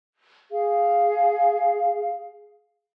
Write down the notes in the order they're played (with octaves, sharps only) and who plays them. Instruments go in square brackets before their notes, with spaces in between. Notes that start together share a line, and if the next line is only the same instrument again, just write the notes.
[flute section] G#4 F5